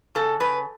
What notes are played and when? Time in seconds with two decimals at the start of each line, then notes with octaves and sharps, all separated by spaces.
0.15 C#3 A4
0.40 C#3 B4